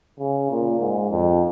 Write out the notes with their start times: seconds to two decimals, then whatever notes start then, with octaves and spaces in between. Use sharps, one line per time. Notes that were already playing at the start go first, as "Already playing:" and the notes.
0.19 C#3
0.51 A#2
0.80 G#2
1.11 F2